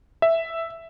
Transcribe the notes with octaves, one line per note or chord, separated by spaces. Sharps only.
E5